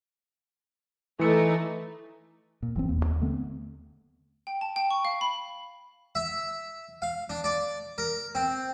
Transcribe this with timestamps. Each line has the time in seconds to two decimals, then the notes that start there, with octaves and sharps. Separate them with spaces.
1.19 E3 A3 D#4 C#7
2.63 A#2
2.76 F#1 E3 F3 C4
2.88 E1 D#2 A#3
3.05 D#2
3.21 D3 A3 B3 C4
4.47 G5
4.61 A5
4.76 G5
4.91 C#6
5.05 F5
5.21 B5
6.15 E5
7.02 F5
7.30 D4
7.44 D5
7.98 A#4
8.35 C4